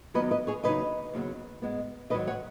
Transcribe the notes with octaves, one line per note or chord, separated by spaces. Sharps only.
F#2 D#3 F#3 B3 B4 D#5
B4 D#5
G#4 C#5
D#2 C#3 F#3 D#4 B4 D#5
D#2 C#3 F#3 B3
G#2 G#3 B3
G#2 D#3 F#3 B4 D#5
C#5 F#5